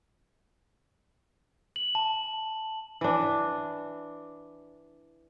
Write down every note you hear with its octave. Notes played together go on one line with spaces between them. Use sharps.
F#7
A5
E3 D4